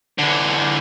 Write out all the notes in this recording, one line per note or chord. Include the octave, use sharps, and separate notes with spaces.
D3 E3